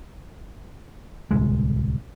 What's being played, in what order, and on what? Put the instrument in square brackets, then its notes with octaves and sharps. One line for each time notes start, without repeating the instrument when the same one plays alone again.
[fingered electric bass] D1 C2 G#3